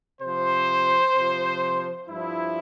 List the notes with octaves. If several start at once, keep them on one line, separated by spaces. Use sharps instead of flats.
C3 F3 C5
C3 F3
G2 F3 E4